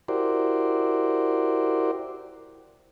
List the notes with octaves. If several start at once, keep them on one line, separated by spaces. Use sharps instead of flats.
E4 F#4 G4 A#4 C5 D5